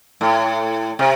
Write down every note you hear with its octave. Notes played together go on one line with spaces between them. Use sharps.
A2
C3